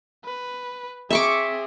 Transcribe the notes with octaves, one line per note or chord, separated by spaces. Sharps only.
B4
C4 G#4 E5 C#6 D6